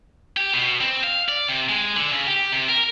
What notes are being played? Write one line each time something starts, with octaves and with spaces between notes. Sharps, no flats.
G4
B2
C4
F5
D5
C3
G#3
D3
C#3
G4
C3
A#4